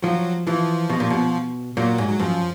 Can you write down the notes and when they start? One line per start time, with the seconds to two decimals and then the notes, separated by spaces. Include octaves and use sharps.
0.03 F3 F#3
0.47 E3 F3
0.90 B2
1.00 A#2
1.10 B2
1.77 A#2 F#3
1.98 G#2
2.08 F#3
2.19 F#2 F3